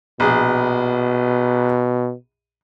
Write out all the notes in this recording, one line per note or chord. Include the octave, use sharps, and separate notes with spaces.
A#1 B2 G#4